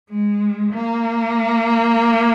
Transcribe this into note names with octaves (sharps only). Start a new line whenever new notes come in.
G#3
A#3